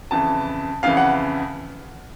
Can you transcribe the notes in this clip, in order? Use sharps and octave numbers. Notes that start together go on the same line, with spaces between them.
F2 C#3 E3 A5
F2 C#3 E3 F5
F#5